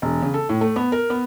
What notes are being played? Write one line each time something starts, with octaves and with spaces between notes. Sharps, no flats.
E1
C#3
A4
A2
A3
B3
A#4
B3